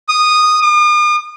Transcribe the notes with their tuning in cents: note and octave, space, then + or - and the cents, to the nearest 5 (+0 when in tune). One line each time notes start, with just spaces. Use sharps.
D#6 -10
D#6 -45